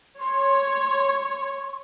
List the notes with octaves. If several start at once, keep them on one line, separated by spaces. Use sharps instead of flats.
C#5 C6